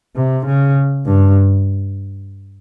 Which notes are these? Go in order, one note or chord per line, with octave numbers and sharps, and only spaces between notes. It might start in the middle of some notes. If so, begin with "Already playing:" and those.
C3
C#3
G2